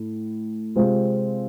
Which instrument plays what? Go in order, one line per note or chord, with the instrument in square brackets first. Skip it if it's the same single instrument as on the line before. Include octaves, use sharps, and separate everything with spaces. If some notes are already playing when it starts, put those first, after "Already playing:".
Already playing: [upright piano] A2
C3 G#3 C4 F4